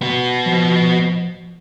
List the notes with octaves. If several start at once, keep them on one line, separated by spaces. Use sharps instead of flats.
B3 F#4
F3